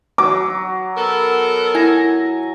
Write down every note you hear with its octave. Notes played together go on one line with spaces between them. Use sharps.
F#3 D6
B3 A4 A#4
E4 G#5 A#6